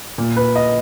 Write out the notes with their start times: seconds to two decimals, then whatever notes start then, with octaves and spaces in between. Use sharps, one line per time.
0.18 A#2
0.36 B4
0.56 D#5